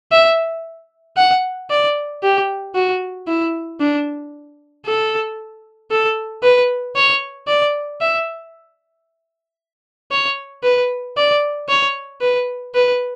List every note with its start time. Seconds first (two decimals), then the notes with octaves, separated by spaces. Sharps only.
0.12 E5
1.17 F#5
1.70 D5
2.23 G4
2.75 F#4
3.28 E4
3.80 D4
4.86 A4
5.91 A4
6.43 B4
6.96 C#5
7.48 D5
8.01 E5
10.12 C#5
10.64 B4
11.17 D5
11.69 C#5
12.21 B4
12.75 B4